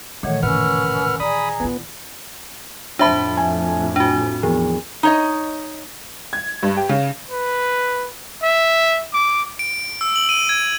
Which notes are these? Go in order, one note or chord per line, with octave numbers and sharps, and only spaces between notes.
A#2 D#3 E3 F#3 A3 A4 C#5 F#5
F#1 A2 C#4 A#4 B4 F#5 E6 F6
E3 G#4 D5 A#5 B5 D#6
B3 E4 F4
F2 A2 D4 C5 E5 A5 B5
G#5
D4 F#4
E2 F3
D#4 C#5 D#5
G#6
G2
G4
C#3
B4
E5
D6
D7
E6
F#7
D#7
G#6